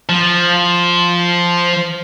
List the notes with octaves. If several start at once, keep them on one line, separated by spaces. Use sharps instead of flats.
F3